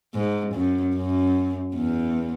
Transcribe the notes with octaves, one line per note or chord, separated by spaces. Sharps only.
G#2
F#2
F#2
E2